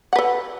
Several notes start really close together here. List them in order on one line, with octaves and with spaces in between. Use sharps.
F#5 B4 A4